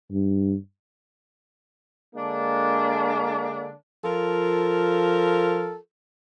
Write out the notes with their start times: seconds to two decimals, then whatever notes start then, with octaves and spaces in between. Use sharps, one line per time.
0.12 G2
2.16 D3 G#3 A#3 D4
4.04 F3 F4 A4 A#4